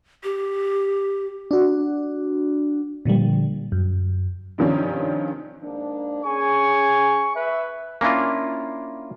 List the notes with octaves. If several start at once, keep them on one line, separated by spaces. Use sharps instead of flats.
G4
D4 F#4
A#2 D3 F3 G3
F#2
G2 C3 D#3 F3 C#4 D4
G#2 A#3 D4
C#4 G#4 G#5 C#6
B4 E5
A#3 C#4 D4 E4 F4